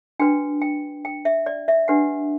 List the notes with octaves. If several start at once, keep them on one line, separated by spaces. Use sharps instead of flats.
D4 F#4 B4 G5
G5
G5
E5
D5
E5
D4 G4 B4 F#5